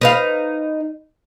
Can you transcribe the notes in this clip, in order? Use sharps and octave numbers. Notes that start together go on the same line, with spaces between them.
D#4 B4 F5